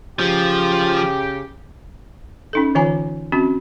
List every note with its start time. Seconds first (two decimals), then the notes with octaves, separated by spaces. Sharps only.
0.19 C#3 F3 G4
2.53 C#4 D#4 A4
2.75 D3 E3 F4 G#5 A#5
3.32 C4 C#4 F#4